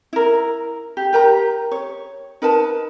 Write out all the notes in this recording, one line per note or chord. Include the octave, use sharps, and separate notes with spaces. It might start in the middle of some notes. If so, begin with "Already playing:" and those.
E4 A#4
G4
G4 A#4 G5 A#5
C#5
D#4 A#4 B4 A5